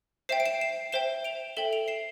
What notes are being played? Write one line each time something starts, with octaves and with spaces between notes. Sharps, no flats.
C5 E5 G5 C7 E7
D7
C7 E7
C7 E7
C5 E5 G5 E7 G7
D7 F7
A4 E5 G5 E7 G7
D7 F7
C7 E7